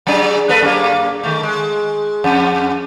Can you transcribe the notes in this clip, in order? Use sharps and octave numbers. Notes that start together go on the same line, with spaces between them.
F#3 D4 G#4
A#3 A4 B4
F#2 A#3
D#3 A3
G#3
F2